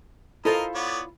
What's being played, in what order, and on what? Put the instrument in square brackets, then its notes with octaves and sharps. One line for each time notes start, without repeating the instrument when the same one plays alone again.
[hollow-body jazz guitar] E4 F4 F5 [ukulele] A4 C5 [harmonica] A#4 D#5
[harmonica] B3 C#5 D5